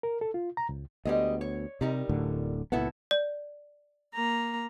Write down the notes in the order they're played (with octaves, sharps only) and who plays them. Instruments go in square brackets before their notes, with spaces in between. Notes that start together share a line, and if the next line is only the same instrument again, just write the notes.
[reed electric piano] A#4
A4
F4
A#5
C#2
[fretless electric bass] D2 B3 [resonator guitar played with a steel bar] G3 G#3 D#5
[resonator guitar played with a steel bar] C#5
[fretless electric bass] C3 [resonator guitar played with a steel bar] G3 D#4 A#4
[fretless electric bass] D1 A2 D3
[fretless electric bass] C#2 A#2 B3 [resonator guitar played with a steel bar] E4 F#4 A4
[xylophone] D5
[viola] A#3 A#5